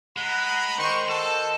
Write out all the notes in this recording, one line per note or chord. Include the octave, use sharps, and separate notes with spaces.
G#3 F#5 A#5 B5
D#3 C5 C#6
G#3 F#4 A4 A5